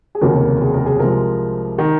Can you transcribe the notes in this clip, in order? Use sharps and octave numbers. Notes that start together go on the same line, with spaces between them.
G#4
F1 D#2 C#3 F#3 A#3 A#4
G#4
A#4
G#4
C2 C3 F3 G#3 A#4
D#3